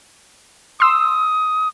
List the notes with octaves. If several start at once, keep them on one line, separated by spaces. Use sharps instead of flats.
C6 D#6 E6